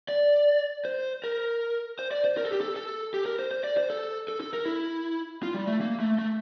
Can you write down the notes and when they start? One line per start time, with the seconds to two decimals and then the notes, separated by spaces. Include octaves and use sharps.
0.09 D5
0.85 C5
1.24 A#4
1.99 C5
2.11 D5
2.24 C5
2.37 A#4
2.45 A4
2.52 G4
2.61 A4
2.76 A4
3.14 G4
3.26 A#4
3.39 C5
3.51 C5
3.64 D5
3.77 C5
3.90 A4
4.28 A4
4.41 A4
4.53 A#4
4.66 E4
5.43 F4
5.54 G3
5.67 A3
5.81 A#3
6.00 A3
6.18 A3